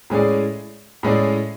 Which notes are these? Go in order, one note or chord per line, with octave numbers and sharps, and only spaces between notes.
A2 G#3 C#4 G#4 D5
A2 G#3 C#4 G#4 D5